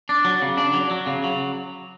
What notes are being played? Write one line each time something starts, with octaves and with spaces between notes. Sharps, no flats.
D4
F#3
C#3
D4
F#3
F#3
C#3
F#3